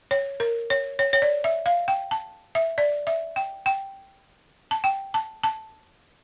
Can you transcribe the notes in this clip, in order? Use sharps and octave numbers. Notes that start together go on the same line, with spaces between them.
C#5
A#4
C#5
C#5
C#5
D5
E5
F5
G5
A5
E5
D5
E5
G5
G5
A5
G5
A5
A5